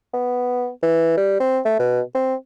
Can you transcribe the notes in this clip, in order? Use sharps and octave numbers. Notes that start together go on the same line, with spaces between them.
B3
E3
G3
C4
A3
B2
C4